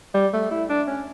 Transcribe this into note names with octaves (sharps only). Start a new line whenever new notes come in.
G3
A3
E4
D4
C#4